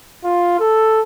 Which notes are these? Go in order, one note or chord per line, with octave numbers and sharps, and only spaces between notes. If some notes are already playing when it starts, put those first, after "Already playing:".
F4
A4